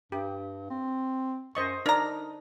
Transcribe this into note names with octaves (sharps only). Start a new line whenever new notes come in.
G2 G4
C4
F#2 C5 D#5 C#6
D4 D#4 A#4 A#5